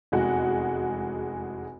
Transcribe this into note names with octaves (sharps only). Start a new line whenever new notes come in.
F1 E2 G#3 F#4 F#5